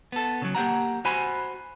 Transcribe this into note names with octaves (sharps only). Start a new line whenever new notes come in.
B3 A4
C#3 F#3
A#3 G4 F#5 A#5
F#4 C5 G#5 B5